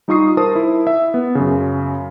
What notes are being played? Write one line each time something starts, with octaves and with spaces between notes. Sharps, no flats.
G3 D#4 F4 C#6 D#6 C7
A#4 C5 A5 D#6
E4
E5
B3
F#2 C#3